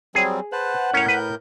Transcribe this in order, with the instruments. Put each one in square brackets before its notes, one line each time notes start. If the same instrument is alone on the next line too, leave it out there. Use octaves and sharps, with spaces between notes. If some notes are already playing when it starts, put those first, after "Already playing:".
[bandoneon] F#3 G3 C4 [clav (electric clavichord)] G#4
[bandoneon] B4 C5 A5 [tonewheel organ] F#5
[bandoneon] A2 A#4 G6 [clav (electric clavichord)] C#4 C#5
[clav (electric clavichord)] B4